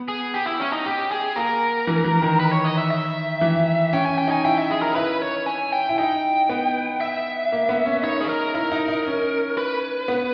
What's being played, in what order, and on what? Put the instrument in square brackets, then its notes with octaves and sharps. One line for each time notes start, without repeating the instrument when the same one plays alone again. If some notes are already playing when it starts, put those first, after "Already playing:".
Already playing: [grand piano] B3
[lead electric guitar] G#4
G4
E4
C#4
D#4
G4
G#4
[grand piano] A#3 [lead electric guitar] A#4
[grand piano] E3
E3
D#3
[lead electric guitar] B4
C#5
D#5
E5
E5
[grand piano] E3
[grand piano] C#4 [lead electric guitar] G5
[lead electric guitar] G#5
G5
[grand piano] D#4 [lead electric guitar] G#5
[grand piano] E4 [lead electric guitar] G5
[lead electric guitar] E5
G#4
A#4
[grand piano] E4 [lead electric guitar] B4
[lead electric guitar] C#5
G#5
G5
[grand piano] E4
[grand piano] D#4 [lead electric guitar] G5
[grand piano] B3
[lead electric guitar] E5
[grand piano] A#3
B3
C#4
[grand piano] D#4 [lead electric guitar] C#5
[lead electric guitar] G#4
A#4
[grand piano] E4 [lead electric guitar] A#4
[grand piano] D#4
D#4
C#4
[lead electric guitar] B4
[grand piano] B3